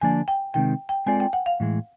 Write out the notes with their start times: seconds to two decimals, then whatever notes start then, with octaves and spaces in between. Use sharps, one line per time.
0.01 D3 F3 A#3 D4 G#5
0.28 G5
0.54 C3 D#3 G#3 C4 G5
0.89 G5
1.06 G#3 C4 F4 A4 D5 G#5
1.20 G5
1.33 F#5
1.46 F5
1.60 A2 E3 G#3